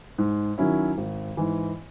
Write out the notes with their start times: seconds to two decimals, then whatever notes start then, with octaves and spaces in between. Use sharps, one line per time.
0.18 G#2
0.58 D#3 F#3 C#4 E4
0.98 G#1
1.37 G#2 E3